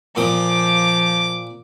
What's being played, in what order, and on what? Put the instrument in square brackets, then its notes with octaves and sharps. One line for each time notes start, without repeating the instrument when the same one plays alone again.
[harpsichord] A#2 D#6 [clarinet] F3 [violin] D6